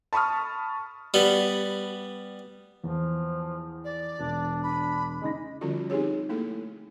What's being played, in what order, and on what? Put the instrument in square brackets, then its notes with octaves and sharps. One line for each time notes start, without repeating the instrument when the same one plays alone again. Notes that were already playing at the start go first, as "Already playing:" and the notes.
[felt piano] A5 B5 C#6 D#6 F6
[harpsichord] G3 B3
[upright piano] E2 [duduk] F3
[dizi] D5
[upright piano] E1 [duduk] D4
[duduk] D4 [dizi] B5
[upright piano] C#3 D#4 A#6 [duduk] G#3
[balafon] D3 F3 G3 C#4 F4 F#4
C4 D#4 G4 G#4 C#5
A3 A#3 E4 A4